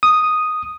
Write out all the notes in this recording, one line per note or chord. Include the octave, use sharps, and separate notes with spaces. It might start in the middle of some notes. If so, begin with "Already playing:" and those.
D#6